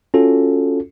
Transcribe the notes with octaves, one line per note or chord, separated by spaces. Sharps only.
C#4 F4 F#4 A4